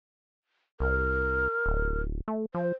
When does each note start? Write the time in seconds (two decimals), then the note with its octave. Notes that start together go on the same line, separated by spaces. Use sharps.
0.80 C2 A#4
1.66 D1
2.28 A3
2.55 F3 C5